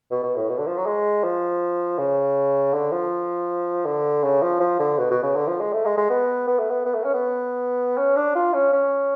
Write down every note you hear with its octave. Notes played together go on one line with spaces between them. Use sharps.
B2
B2
A2
B2
D3
F3
F#3
G#3
F3
C#3
D3
F3
D3
C#3
F3
F3
D3
B2
B2
C#3
D3
F3
G#3
A3
G#3
G#3
B3
B3
A3
B3
B3
A3
C#4
B3
C#4
D4
F4
C#4
C#4